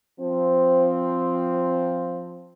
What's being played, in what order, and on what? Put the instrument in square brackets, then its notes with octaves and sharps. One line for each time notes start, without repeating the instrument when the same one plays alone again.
[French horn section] F3 C4